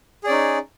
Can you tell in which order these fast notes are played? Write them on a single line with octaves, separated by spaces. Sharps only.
G#4 D5 C#4 D#4